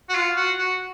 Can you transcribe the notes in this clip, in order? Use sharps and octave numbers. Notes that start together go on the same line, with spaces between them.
F#4
F4
F#4
F#4